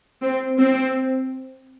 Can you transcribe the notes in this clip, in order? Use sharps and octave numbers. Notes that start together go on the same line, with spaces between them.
C4
C4